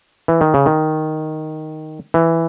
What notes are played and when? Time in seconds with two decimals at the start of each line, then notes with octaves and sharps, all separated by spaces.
0.28 E3
0.41 D#3
0.54 C#3
0.66 D#3
2.14 E3